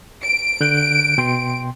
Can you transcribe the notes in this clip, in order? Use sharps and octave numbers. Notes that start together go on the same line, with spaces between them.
D7
D3 F#6 G6
B2 G5 C6